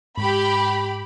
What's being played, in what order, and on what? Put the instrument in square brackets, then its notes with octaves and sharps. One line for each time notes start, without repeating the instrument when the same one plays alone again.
[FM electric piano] G#2 [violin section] G4 B5